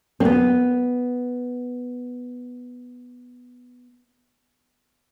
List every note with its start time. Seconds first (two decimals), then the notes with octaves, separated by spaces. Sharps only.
0.20 C4
0.25 B3